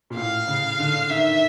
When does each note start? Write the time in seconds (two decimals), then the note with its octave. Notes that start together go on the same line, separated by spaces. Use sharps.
0.10 A#2
0.16 A2 F5
0.48 C#3
0.79 D3
1.09 D#3 E5